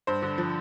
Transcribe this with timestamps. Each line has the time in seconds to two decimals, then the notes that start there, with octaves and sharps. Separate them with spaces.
0.07 G2 C5
0.22 D3
0.38 F3